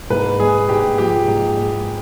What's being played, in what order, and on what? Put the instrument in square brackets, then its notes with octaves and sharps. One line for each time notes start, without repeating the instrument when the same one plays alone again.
[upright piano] G#2 [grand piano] B4
[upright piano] G#3 [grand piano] G#4
[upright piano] G#2 [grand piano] G4
[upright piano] F3 [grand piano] G4
[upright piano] G#2
G#3